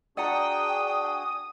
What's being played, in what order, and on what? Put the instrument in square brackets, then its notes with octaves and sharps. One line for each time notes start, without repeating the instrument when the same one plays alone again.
[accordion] D4 F#4 G#4 [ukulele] D5 F#5 A#5 [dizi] G5 [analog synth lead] D#6